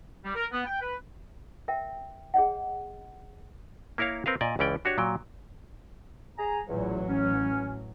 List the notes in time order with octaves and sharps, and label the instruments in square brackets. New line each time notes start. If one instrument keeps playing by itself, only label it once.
[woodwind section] G3
A#4
B3
G5
B4
[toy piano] A#4 E5 G5
G#4 C#5 D#5 F#5
[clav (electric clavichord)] A#3 E4 A#4 C#5 F5
C4 A#4 B4 F5
A#2 D5 D#5 G#5
C#2 E3 C#4 D5 G5
D4 F#4 G4 C#5
A#2 F#3 G5
[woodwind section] G#4 A#5
[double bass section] A1 E3 F#3 [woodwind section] E2 A#2
[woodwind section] C#4